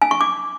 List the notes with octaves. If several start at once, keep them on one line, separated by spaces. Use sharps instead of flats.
G#5
C#6
D6